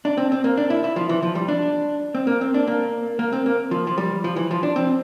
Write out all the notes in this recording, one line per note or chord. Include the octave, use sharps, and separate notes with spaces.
D4
C4
C4
A#3
D4
E4
E4
F3
E3
F3
G3
D4
C4
A#3
C4
D4
A#3
A#3
C4
A#3
F3
F3
G3
F3
E3
F3
D4
C4